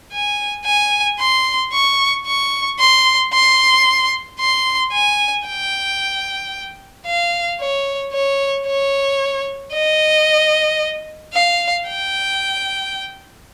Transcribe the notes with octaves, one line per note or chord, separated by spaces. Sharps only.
G#5
G#5
C6
C#6
C#6
C6
C6
C6
G#5
G5
F5
C#5
C#5
C#5
D#5
F5
G5